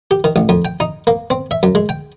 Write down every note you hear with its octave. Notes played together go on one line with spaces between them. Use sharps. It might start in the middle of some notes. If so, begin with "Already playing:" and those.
G4
D#3
A1
F2
G5
D#4
A#3
C4
E5
F#2
G#3
G5